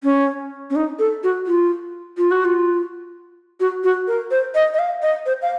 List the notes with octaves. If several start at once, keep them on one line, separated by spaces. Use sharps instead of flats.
C#4
C#4
D#4
A4
F#4
F4
F4
F#4
F4
F#4
F#4
A#4
C5
D#5
D#5
F5
D#5
C5
F5